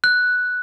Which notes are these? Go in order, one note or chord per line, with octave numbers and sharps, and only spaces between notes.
F#6